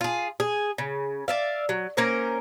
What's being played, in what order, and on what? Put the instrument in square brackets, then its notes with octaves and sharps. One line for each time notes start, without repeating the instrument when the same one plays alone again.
[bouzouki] F4 G#4
G#4
C#3
D5 E5 F5
F#3
A#3 C#4 A#4 C5